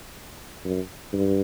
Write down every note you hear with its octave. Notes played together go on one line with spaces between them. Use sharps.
F#2
G2